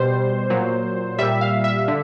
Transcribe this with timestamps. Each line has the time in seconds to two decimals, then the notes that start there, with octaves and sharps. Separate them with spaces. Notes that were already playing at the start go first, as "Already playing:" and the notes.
Already playing: B2 G3 C5
0.50 A#2 F#3
1.19 A#2 G3 E5
1.41 F5
1.64 E5
1.88 D3